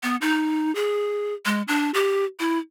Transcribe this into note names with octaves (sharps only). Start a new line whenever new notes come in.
B3
D#4
G#4
G#3
D4
G4
E4